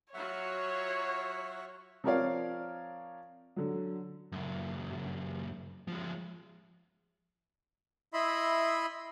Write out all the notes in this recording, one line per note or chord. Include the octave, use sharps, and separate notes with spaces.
F#3 F4 F#4 C#5 E5 F#5 C#6
F3 C4 A#4 C#5 D5 F5
D3 F#3
C#2 F#2
F3 G#3
E4 D#5 E5 B5 C6